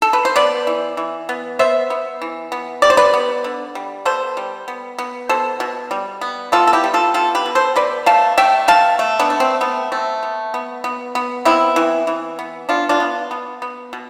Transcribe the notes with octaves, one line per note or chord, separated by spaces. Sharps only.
A4
B4
C5
B3 B4 D5
E3
E3
B3
B3 C5 E5
B3
E3
B3
G3 D5
C5
B4 D5
B3
D3
G3
B3 A4 C5
G3
B3
B3
B2 A4 C5
B2
G3
B3
B3 F4 A4
A4
E4 G4
G3
F4 A4
B3 F4 A4
G4 B4
B2
A4 C5
B2 B4 D5
A3 F5 A5
A3 E5 G5
B2 F5 A5
A3
B3 D4
A3
C4
A3 B3
A3 C4
B3
B3
B3
B3
B3 C4 E4
E3
E3
B3
B3 D4 F4
D4 F4
B3
B3
B3
B2